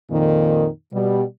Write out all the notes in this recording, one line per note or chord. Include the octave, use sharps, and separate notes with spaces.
F2 A#2 D#3
B2 G3